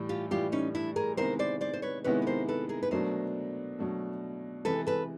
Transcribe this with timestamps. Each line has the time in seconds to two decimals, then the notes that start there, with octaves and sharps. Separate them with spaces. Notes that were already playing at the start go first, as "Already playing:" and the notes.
Already playing: A2 E3 G3
0.09 F4 G4
0.31 A2 E3 G3 F4 G4
0.52 C#4 D#4
0.75 D4 E4
0.96 G#4 A#4
1.17 C3 D#3 G#3 B3 E4 A#4 C5
1.39 C5 D5
1.61 C5 D5
1.73 C5
1.82 B4 C#5
2.04 C3 D#3 G#3 B3 E4 B4 C#5
2.22 B4
2.27 A#4 C5
2.48 A4 B4
2.69 G#4 A#4
2.83 B4
2.91 B2 F#3 A3 D4 A#4 C5
3.79 B2 F#3 A3 D4
4.65 C3 E3 G#3 A4 B4
4.87 A4 B4